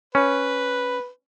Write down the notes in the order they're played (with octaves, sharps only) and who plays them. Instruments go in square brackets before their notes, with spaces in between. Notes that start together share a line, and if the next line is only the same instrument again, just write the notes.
[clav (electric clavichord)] C#4 [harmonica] B4